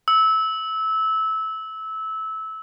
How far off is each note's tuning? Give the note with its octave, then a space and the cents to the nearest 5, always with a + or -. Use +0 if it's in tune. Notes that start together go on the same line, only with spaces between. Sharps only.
E6 -20